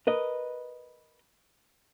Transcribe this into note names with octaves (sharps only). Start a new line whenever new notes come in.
A#4 B4 D#5